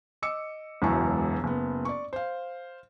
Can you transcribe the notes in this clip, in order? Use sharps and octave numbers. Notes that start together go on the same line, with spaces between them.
D#5 D6 E6 C#7
E1 C#2 F#2 B2 E3 C#6
F#1 B3
D5 C#6
C5 F5